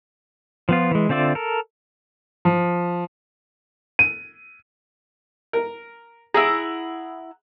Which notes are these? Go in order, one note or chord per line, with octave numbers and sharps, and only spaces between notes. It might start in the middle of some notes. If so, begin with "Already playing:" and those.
F3 B3 F4
E3 G#3
D3 C4 F4 D5 E5
A4 A#4
F3
D#7
A#4
E4 G#4 F#5 A#5